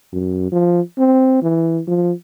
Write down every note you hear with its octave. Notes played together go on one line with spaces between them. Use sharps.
F#2
F3
C4
E3
F3